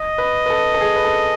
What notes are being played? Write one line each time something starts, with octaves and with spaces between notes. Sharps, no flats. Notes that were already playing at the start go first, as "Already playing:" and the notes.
Already playing: D#5
B4
B4
A4
A4
G#4
B4
A4